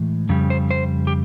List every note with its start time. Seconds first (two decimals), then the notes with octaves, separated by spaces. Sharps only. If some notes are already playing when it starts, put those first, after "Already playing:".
Already playing: A2 E3 G#3
0.29 F2 C#3 G3
0.50 C5
0.71 C5
1.07 G4